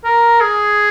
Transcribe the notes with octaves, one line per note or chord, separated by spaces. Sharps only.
A#4
G#4